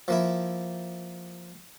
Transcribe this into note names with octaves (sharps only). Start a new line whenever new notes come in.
F3 A#3 E4